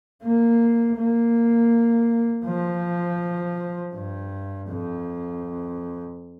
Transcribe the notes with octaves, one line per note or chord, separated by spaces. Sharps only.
A#3
A#3
F3
G2
F2